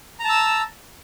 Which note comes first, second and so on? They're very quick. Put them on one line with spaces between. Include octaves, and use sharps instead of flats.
A#5 A5 E6